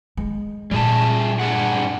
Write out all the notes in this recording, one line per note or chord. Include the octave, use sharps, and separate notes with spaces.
G#3
A#2 G3 G#4 A5
G2 G#4 F#5